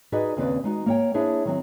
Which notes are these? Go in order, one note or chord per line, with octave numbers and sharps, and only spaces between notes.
D#4 F#4 G#4 B4 D5 D#5
D#2 C#3 C4 B4 D5
G#3 D#4 F#4
A#3 C#5 G5
D4 E4 G#4 C5 C#5
D#3 F#3 C4